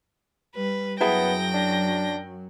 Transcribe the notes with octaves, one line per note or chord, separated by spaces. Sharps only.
G3 B4
F#2 F#3 B3 E4 G#4 G5 A5 A#6
D4